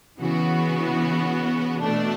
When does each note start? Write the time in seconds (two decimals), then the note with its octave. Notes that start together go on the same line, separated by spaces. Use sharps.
0.19 C#3 E3 B3 F#4
1.80 B2 A3 D4